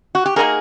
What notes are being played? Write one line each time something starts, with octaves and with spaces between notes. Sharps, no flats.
F#4
G4
A#3 D#4 F#4 G#4 A#4